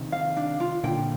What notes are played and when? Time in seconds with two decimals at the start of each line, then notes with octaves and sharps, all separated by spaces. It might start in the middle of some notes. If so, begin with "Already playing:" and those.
Already playing: C3 D#3
0.12 F5
0.37 D4
0.60 F4
0.84 A#2 D3 G5